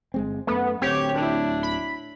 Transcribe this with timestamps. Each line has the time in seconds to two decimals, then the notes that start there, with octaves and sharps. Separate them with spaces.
0.14 G1 G#3 C4
0.47 F#2 A3 B3
0.82 D1 D2 C4 G4 C#5
1.14 D4 E4
1.63 B5